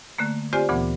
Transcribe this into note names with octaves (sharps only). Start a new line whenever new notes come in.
D3 A3 A#3
C4 F4 G4 C5 D5 G#5
D2 A#2 E3 B3 F#5